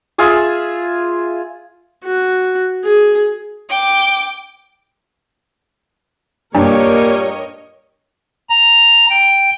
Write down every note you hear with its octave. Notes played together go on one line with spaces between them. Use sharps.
F4 G#4 E5
F#4
G#4
G5 D6
G2 A#2 G3 A#3 A#4 C#5 D#5
A#5
G5